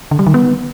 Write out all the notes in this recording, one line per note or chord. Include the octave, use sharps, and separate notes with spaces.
D3
G3
D#3
B3